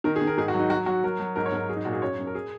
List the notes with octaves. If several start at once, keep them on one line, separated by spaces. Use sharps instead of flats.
D#3 A#4
G#4
D#3
A#4
G#2 G#4
F#4
F#3
D#4
F#3 F#4
F#3 F#4
F#3 A#4
F#3
G#2 A#4
C#5
G#2 A#4
F#3 G#4
D#4
A#2 F#4
G#4
F#2 C#5
F#2
A#4
G#4